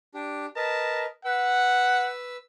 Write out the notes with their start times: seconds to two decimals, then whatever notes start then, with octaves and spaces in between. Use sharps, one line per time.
0.14 D4 G4
0.56 A#4 B4 D#5 A5
1.25 B4 F#5 E6